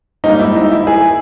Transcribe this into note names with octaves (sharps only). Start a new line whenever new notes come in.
G#2 G3 A#3 D#4
E4
D#4
E4
G#4